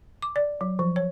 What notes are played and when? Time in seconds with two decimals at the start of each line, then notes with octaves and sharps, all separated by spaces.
0.22 D6
0.36 D5
0.61 F#3
0.79 F3
0.96 C#5